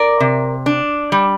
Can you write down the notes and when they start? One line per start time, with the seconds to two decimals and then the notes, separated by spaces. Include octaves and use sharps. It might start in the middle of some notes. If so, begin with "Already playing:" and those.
Already playing: A#4 D5
0.20 C3
0.66 D4
1.12 G3